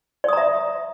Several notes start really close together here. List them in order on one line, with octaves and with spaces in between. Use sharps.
D5 D#6 A#5 E5